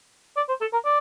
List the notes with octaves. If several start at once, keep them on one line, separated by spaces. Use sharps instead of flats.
D5
C5
A4
A#4
D5